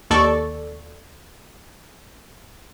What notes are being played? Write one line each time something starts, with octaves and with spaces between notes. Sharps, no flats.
D#2 A4 D5 C#6